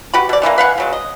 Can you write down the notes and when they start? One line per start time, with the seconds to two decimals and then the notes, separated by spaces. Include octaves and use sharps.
0.14 F#4 G4 B4 B5
0.29 B2 D5
0.42 D3 E3 G3 A#3
0.58 B4 F5 F#5 G#5
0.78 C#3 F#3 G#3
0.93 D#5